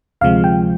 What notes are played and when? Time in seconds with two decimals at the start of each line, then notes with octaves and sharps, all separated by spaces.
0.21 D2 C3 F3 G#3 F5
0.44 G5